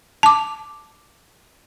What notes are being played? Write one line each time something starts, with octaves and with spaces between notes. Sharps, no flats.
A5 D6